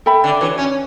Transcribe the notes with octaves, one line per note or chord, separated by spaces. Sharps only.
A4 E5 G5 B5
D3
E3 D4 F#4 C#5
C#4